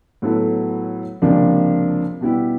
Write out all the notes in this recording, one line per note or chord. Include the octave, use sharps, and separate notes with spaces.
A2 F#3 B3 E4 A4
C#2 C3 F3 A#3 D4
B2 G3 B3 E4 G4